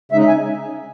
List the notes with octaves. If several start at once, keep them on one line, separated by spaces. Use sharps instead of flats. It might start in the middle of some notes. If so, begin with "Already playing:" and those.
C#3 G#3 D#4 E5
G#5